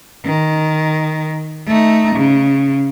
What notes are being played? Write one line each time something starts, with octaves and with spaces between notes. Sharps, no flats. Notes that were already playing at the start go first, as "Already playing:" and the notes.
D#3
A3 D#4
C#3